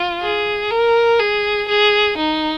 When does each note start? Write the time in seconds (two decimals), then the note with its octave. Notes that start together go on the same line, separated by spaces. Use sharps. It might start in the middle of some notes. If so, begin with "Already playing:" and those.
Already playing: F4
0.21 G#4
0.71 A#4
1.20 G#4
1.69 G#4
2.17 D#4